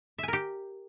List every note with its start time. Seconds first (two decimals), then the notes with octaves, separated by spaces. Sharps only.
0.18 E5
0.23 G#5
0.28 A#4
0.33 G4